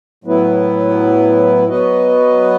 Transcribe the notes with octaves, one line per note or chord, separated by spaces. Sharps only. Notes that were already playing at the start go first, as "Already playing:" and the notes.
A2 F#3 B3 E4 B4
F#3 B3 F#4 B4 D#5